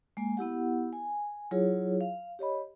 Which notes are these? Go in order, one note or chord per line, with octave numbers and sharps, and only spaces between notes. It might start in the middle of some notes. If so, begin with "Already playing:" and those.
G#3 A#3 G#5
B3 E4 G4 F#5
G#5
F#3 E4 F4 G#4 C#5
F5
G4 C#5 D#5 B5